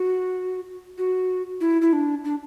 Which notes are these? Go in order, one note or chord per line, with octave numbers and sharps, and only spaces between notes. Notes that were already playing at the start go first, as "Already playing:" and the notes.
Already playing: F#4
F#4
E4
E4
D4
D4